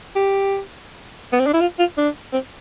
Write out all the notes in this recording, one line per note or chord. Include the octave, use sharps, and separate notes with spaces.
G4
B3
C4
D4
E4
F4
F4
D4
C4